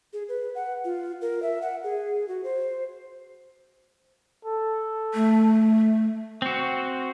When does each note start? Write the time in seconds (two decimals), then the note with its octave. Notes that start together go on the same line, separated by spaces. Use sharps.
0.13 G#4
0.28 B4
0.55 F#5
0.85 F4
1.21 A#4
1.43 E5
1.62 F#5
1.84 G#4
2.28 F#4
2.44 C5
4.45 A4
5.14 A3
6.42 C4 F#4